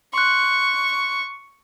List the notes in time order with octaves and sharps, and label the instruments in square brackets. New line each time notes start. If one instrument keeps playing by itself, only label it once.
[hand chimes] C6 F#6 [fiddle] C#6